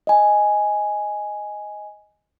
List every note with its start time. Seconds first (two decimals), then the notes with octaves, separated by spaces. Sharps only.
0.07 D#5 G#5